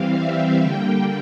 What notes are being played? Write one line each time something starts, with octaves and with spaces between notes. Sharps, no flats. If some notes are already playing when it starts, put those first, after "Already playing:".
Already playing: E3 G3 C4 F5
E5
D3 G3 A#3 G5